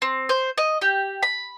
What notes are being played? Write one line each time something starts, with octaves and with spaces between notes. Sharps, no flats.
C4
C5
D#5
G4
B5